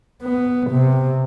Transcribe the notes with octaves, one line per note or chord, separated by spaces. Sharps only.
B3
C3